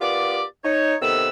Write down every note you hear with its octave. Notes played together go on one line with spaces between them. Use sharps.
B3 F4 G4 A#4 D5
D#4 C#5
C3 D#3 B3 A4 B4 E6